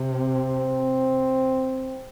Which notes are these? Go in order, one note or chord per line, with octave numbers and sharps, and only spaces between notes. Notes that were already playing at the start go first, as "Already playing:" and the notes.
Already playing: C3
C4